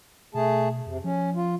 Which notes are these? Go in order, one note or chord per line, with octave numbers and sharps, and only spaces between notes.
B2 A3 G#4 A5
F2 C3
F3 C#4
F4